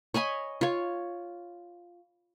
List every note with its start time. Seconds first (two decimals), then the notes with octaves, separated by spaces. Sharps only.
0.14 C#5 D#5 G#5 B5
0.61 F4 C#5